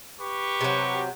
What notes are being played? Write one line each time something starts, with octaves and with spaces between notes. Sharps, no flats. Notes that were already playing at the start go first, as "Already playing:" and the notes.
G4 B4 C#6
C3 F#3